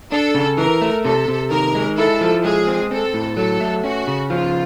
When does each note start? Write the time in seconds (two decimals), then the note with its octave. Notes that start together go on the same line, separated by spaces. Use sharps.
0.12 D4 A4
0.35 C#3
0.58 E3 A#4
0.81 A3
1.04 C3 A4
1.28 C3
1.51 D#3 A#4
1.75 G#3
1.97 E4 A4
2.21 F3
2.45 G#3 G#4
2.67 C4
2.91 C4 A4
3.14 A2
3.37 F#3 A4
3.61 A3
3.84 C#4 F#4
4.07 C#3
4.30 F3 F4